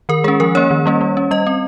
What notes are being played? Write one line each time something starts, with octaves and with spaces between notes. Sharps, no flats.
D#3 A#4
G#3 C#4 G#4
F3 A#4
A#3 C#4 C#5
D#3
G3 A#3 C#4
G3
C#4
G3 D#5
C4